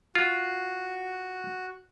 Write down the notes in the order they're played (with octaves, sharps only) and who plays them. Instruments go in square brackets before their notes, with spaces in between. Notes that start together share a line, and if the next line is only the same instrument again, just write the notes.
[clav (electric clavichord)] F4 [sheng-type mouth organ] F#4